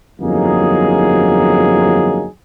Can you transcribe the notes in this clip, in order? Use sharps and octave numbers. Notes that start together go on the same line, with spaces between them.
G1 F2 F#3 A#3 D#4 G#4